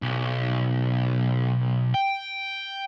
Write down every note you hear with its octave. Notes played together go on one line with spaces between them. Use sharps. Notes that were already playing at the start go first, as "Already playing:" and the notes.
B1
G5